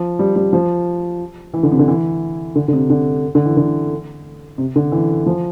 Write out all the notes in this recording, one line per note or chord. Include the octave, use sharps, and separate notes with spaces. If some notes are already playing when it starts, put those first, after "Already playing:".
Already playing: F3
G3
G3
F3
E3
D3
C3
D3
E3
D3
D3
C3
D3
D3
E3
D3
C3
D3
E3
F3